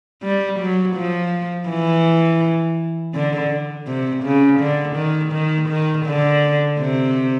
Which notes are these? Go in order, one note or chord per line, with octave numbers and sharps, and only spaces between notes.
G3
F#3
F3
E3
D3
C3
C#3
D3
D#3
D#3
D#3
D3
C3